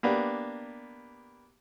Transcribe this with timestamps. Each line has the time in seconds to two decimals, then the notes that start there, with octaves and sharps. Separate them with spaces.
0.03 A#3 B3 D4 G4